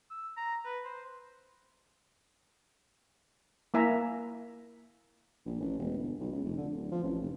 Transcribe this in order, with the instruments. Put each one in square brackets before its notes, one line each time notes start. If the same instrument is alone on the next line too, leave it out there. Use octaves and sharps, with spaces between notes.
[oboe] E6
A#5
B4
C5
[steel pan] A#3 E4 E5 G#5 A#5
[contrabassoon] A#1
A1
E1
G1
B1
C#2
F1
D3
D1
F3
A1
F1